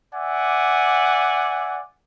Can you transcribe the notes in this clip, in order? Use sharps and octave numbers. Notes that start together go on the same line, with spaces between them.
D5 E5 F#5 G#5 D6